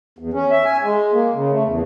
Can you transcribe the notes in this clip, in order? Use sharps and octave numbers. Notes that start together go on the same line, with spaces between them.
E2
C#4
E5
G#5
G#3
A#3
C#3
A3
E2